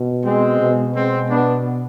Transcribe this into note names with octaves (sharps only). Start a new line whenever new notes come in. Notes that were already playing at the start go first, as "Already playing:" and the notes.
Already playing: B2
G#3 C4
B2
G#3 C4
B3 D4